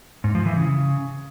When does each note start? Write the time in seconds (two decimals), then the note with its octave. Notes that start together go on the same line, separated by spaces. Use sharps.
0.24 G#2
0.35 F3
0.46 E3
0.57 C#3